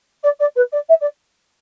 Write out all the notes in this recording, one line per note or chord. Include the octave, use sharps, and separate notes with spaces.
D5
D5
B4
D5
E5
D5